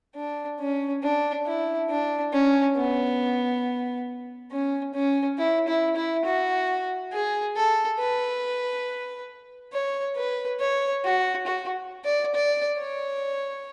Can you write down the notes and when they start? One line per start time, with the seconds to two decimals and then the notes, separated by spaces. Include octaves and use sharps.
0.15 D4
0.60 C#4
1.03 D4
1.46 E4
1.90 D4
2.33 C#4
2.77 B3
4.52 C#4
4.94 C#4
5.38 E4
5.68 E4
5.96 E4
6.25 F#4
7.13 G#4
7.56 A4
7.99 B4
9.73 C#5
10.16 B4
10.60 C#5
11.05 F#4
11.47 F#4
12.05 D5
12.35 D5
12.78 C#5